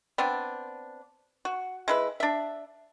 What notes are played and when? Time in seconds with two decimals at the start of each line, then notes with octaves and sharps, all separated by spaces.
0.18 B3 C4 D4
1.45 F#4
1.88 G#3 E4 B4
2.20 D4 E5